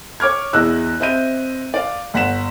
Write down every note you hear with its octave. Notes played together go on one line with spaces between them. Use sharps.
C#5 D6 F6 G#6
E2 E4 D#5 E6 F#6
C4 D#5 E5 G6 D#7
D5 F5
G1 F#5 B6 E7